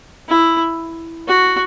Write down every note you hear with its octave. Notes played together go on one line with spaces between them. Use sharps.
E4
F#4